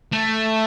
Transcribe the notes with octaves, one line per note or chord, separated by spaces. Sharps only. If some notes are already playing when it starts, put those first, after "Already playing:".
A3